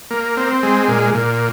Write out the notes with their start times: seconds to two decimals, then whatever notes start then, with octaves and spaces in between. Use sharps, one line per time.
0.11 A#3
0.37 C4
0.63 G#3
0.88 A#2
1.14 A#2